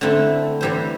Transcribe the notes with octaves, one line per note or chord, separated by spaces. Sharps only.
D3 A3 C4 E4
E3 G3 E4 C5